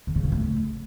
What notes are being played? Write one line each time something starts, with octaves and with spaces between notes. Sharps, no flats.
D3
C#3
A2
A3